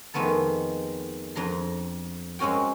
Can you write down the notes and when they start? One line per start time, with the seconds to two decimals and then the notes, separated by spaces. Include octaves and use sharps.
0.14 F2 D#3 G#3 A3 B3 A5
1.35 F2 D4 A#5 C6
2.39 G#3 C4 C#4 F#4 G5